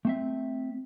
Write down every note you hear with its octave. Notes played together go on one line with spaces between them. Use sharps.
A3 C4 E5